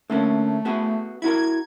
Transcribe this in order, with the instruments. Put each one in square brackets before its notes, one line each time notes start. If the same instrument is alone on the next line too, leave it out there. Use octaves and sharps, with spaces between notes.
[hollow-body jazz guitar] D3 A#3 C#4 [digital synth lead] A3
[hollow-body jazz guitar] B3 F#4 G#4
[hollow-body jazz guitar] E4 F#4 A#4 [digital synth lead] G#6